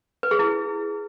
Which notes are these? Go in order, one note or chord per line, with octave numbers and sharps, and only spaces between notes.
B4
G#4
E4